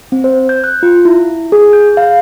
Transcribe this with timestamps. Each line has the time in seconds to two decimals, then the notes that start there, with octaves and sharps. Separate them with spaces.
0.12 C4
0.24 C5
0.49 G6
0.64 F#6
0.83 F4
1.05 E4
1.52 G#4
1.73 G6
1.97 F5